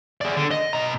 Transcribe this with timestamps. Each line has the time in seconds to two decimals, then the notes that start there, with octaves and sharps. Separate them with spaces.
0.21 G#4 D5
0.37 D3
0.51 D#5
0.73 B2 A#5